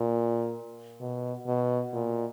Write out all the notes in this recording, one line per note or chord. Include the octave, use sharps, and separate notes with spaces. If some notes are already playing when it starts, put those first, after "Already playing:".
Already playing: A#2
B2
B2
A#2